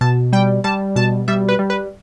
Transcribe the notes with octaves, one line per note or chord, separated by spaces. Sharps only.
B2 A5
G3 G5
G3 A5
B2 A5
G3 E5
B4
G3
B4